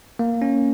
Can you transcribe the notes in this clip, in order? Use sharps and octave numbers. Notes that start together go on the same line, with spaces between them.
A#3
C#4